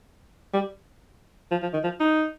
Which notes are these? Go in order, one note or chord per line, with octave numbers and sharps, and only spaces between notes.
G3
F3
F3
D#3
F3
D#4